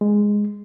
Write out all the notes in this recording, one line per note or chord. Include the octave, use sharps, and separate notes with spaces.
G#3